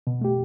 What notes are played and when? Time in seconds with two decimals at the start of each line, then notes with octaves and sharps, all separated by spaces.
0.07 B2
0.21 A3 G4